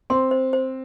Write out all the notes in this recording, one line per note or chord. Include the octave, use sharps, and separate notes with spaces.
C4 C6
C5
C5